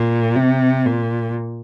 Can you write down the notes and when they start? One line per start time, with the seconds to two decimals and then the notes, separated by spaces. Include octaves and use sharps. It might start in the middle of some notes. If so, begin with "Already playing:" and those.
Already playing: A#2
0.37 C3
0.86 A#2